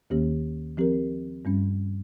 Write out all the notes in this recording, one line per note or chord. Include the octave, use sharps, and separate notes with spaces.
D#2 D#3 A#3 C#4 G4
F3 C4 G4 A#4
G2 G3 C#4